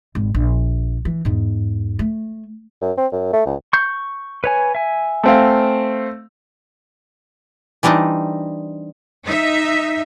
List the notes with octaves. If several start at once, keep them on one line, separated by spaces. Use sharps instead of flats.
G#1
A#1
E3
E2 G#2
A3
F#2
C4
F#2
A3
C#2
C#6 G6
B4 C#5 G#5
E5 G#5
A3 C4 F5
E3 G3 C4 D4 D#4
D#4 E5